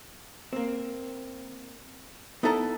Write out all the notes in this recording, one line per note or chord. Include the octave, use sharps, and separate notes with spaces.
A#3 C4
B3 D#4 E4 A4 D5 A#5